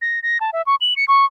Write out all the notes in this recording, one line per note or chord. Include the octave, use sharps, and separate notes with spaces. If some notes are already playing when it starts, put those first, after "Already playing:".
A#6
A#6
A5
E5
C#6
F#7
C#7
C#6